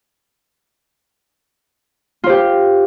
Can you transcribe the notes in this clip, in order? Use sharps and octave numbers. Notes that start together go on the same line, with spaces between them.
F4 G4 C5